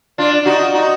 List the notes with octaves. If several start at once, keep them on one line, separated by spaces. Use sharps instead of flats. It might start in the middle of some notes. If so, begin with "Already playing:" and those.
D4 F4
D#4 F#4
D#4 F#4